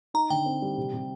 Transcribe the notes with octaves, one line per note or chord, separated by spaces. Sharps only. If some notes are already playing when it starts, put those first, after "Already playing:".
D#4 A#5
D3 G5
C4
G3
C3
C3